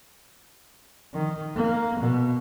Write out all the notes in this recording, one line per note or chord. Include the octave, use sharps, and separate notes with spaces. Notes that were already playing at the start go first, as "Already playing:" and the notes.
D#3
A#3
B2